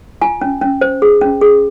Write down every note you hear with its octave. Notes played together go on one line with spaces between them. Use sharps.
F4 G#5
C#4
C#4
C5
G#4
C#4
G#4